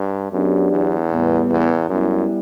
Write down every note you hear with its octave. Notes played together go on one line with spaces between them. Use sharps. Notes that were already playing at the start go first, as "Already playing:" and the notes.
Already playing: G2
F#2 F#3 B3 D4 G4
E2
A2 G3 B3
E2
F#2 G3 B3 E4